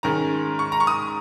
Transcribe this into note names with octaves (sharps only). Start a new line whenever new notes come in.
G#2 D#3 G#3 C#4 A#5
C#6
A#5
C#6
D#6